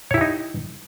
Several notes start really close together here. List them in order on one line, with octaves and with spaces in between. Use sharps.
C#5 E4 G4 D#4